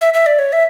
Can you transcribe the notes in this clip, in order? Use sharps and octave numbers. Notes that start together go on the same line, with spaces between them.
E5
E5
D5
C#5
E5